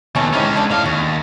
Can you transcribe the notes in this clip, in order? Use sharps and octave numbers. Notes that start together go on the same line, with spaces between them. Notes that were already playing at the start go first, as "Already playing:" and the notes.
D#2 B2 A3 C#4
E3 G#3 C4 C#4 D#4
D3 D4
A2 D#5 F5
D#2 F#4